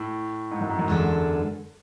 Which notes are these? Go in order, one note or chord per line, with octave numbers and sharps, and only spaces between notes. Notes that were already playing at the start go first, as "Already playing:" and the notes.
Already playing: A2
G#2
F#2
G#2
F#2
E2 D3 G#3 D4 A4